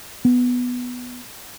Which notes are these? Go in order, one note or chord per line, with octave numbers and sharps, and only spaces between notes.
B3